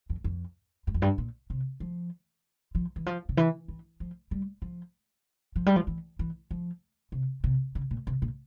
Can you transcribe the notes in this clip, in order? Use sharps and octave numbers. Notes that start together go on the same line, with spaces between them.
F2
F2
G2
F2
G2
A#2
C3
F3
F3
E3
F3
C#3
E3
E3
F3
G3
F3
F3
G3
F3
E3
E3
F3
C3
C3
C#3
A#2
C3
A#2